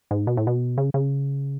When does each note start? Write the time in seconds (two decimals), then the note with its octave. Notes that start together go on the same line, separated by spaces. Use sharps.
0.11 G#2
0.27 B2
0.37 A2
0.47 B2
0.78 C#3
0.94 C#3